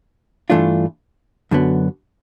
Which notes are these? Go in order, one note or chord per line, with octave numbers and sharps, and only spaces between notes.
G2 E3 A3 D4 F4
F#2 D3 F#3 B3